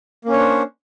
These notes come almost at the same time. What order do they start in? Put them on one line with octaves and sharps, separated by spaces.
A#3 C#4 C#5 D4 C5